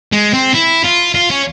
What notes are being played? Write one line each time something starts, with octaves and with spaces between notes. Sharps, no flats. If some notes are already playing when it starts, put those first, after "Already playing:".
G#3
C4
E4
F4
F4
C#4